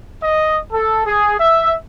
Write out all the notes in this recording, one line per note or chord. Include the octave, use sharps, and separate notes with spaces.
D#5
A4
G#4
E5